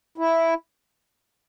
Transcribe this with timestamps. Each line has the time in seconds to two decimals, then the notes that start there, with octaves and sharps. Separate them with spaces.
0.18 E4